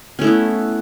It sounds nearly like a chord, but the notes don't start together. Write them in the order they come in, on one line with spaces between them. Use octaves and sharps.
C#4 A3 E4 B3